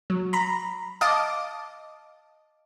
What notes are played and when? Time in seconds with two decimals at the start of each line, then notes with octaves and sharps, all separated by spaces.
0.10 F#3
0.33 A#5 B5
1.01 D#5 F5 A5 D6